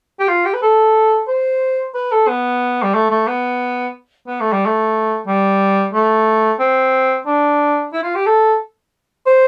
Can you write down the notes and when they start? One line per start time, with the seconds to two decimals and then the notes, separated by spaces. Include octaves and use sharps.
0.19 G4
0.28 F4
0.45 G4
0.54 B4
0.62 A4
1.27 C5
1.94 B4
2.12 A4
2.28 B3
2.83 G3
2.95 A3
3.11 A3
3.28 B3
4.27 B3
4.41 A3
4.53 G3
4.66 A3
5.27 G3
5.93 A3
6.60 C4
7.26 D4
7.93 E4
8.03 F4
8.15 G4
8.26 A4
9.26 C5